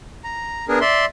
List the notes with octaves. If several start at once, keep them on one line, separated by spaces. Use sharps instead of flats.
A#5
B3 D4 G#4 A#4
D5 E5 C6